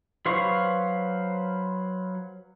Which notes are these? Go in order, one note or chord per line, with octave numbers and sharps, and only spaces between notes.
F#3 B4 C5 F5 C#6